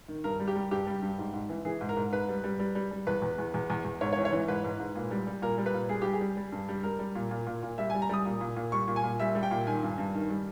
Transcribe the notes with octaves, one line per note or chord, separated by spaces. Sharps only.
D#3
G2 A#4
G3
G4
G3
G2 G4
G3
G2
G#2
G#2
E3
E3 G#4
G#2
A#4
G#2
G#2 B4
G3
G3
G3
G3
G3
E2 B4
E2
E2
E2
E2
E2
G#2 C#5
C#5
E3
C#5
E3
G#2 B4
G#2
G#2
A#2
G3
G3
A#2 A#4
G3
B4
A#2
G3 G#4
G3 G4
G#4
G3
G3
G2
G3
G3 A#4
G3
A#2
A#2
A#2
A#2
G3 E5
G#5
G3
A#5
G3 D#6
A#2
A#2
A#2
G3 C#6
A#2
G#5
A#2
G3 E5
G3
G5
A#2
D#3 G#5
G2
G2
D#3
G3